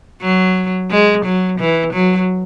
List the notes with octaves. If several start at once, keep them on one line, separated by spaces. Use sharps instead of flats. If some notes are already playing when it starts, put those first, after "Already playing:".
F#3
G#3
F#3
E3
F#3